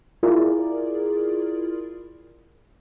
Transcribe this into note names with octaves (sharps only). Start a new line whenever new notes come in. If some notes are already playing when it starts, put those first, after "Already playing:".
E4 F4 G#4 A#4 D5